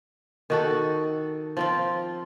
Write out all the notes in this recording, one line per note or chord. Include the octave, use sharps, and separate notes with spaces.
D#3 F#4 A4
F3 C4 F4